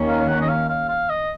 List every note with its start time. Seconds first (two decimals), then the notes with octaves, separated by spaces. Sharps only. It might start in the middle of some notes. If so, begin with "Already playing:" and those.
Already playing: D#2 D#3 A#3 C#4
0.08 F5
0.28 F#5
0.41 D#5
0.48 F5
0.69 F5
0.88 F5
1.09 D#5